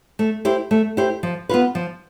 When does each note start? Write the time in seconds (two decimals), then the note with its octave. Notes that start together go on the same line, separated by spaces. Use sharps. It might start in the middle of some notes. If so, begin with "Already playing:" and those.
0.19 A3
0.45 E4 G4 C5
0.71 A3
0.97 E4 G4 C5
1.23 F3
1.49 B3 F4 B4
1.75 F3